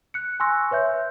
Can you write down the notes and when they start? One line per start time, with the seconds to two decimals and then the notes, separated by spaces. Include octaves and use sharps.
0.14 F#6 C#7
0.40 G#5 C6 C#6 E6 F#6 A#6
0.71 B4 C#5 E5 G6